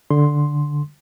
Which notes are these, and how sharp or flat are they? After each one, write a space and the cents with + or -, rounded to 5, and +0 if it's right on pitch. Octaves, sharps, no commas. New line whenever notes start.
D3 +0 C6 +0